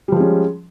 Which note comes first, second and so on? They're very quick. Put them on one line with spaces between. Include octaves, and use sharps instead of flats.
G3 F3 G#3 C#4